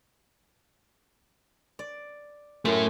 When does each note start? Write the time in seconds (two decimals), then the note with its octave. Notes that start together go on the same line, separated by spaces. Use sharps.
1.79 D5
2.65 F#2 A3 C#4 E4 C6